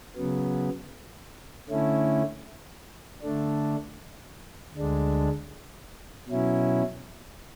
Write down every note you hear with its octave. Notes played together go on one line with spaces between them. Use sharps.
C#3 F#3 B3
D3 A3 C#4 E4
D3 A3 D4
D2 D3 G#3 D4
B2 F#3 C#4 E4